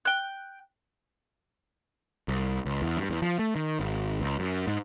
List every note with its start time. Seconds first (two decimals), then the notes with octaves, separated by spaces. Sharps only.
0.05 G5 F#6
2.28 C2
2.66 C#2
2.82 E2
2.97 G2
3.10 E2
3.22 F3
3.39 A3
3.56 D#3
3.80 G#1
4.20 C#2
4.39 F#2
4.67 G#2